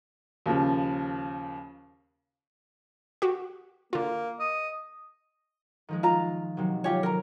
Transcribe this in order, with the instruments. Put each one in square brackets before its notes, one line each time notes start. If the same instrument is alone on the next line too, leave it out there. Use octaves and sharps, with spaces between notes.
[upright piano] D#2 C#3 F3
[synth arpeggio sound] F#4 G4
[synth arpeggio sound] D3 F4 [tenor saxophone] A#3
[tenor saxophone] D#5
[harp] D#3 F3 G#3
[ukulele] F4 A#5
[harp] C3 D#3 F#3
[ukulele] F4 G4 C#5
A#4 A#5